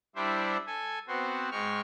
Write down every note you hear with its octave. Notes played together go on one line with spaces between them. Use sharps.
G3 D4 E4 C5 E5
A4 G#5
B3 C4 F#4 C5
G#2 G#3 G5 C#6 F6